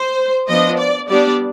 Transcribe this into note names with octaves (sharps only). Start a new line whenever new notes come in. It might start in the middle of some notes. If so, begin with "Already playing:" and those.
Already playing: C5
F3 B3 D4 D#5
D5
G3 B3 D4 D5